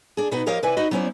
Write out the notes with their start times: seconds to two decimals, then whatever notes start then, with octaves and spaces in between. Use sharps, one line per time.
0.17 D4 G#4
0.31 B2 B3 D#4 F#4 B4 F#5
0.46 F3 G4 A#4 C#5 D#5 F5
0.63 C3 E4 B4 D5 E5 G#5
0.77 D#4 F#4 B4 D#5
0.91 F#3 B3 C#4 E4 C5 D5